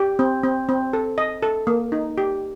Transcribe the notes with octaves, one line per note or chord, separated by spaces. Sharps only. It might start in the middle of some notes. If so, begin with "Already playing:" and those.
Already playing: G4
C4
C4
C4
A4
D#5
A4
A#3
D#4
G4